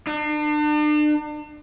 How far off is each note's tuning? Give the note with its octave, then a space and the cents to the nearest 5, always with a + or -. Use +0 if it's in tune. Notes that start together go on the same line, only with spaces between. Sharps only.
D4 +40